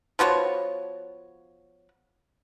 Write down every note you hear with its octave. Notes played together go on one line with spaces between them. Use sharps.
F3 B3 F#4 C#5